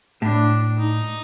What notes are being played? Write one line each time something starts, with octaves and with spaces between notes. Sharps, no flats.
A2 D4
D#4